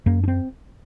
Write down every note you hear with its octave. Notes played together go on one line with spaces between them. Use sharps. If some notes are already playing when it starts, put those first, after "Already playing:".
F#2 A#3
D4
C4